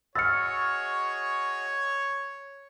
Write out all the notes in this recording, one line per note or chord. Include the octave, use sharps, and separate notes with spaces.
F#4 G#4 C#5 D#5 E6 F6 A6 C#7